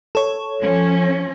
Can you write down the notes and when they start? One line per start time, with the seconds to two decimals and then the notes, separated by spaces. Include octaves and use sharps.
0.15 A4 C#5
0.61 F3 C#4